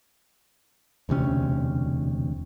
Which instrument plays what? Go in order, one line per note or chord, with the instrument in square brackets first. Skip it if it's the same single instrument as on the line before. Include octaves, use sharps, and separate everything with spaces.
[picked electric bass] E1 D2 C3 C#4